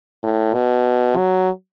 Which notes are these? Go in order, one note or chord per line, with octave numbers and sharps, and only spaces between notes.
A2
B2
F#3